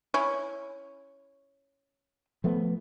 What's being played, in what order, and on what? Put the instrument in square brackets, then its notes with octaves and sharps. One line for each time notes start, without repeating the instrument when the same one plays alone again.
[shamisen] C#4 E4
[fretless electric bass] F3 A3 B3